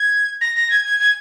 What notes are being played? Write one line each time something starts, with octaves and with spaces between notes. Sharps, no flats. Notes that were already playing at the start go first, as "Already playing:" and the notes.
Already playing: G#6
A#6
A#6
G#6
G#6
G#6